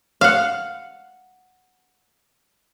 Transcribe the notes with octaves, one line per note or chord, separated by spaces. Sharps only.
F5 F#5